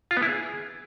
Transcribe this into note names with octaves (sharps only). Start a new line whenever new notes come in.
F4
B3
E4
G#4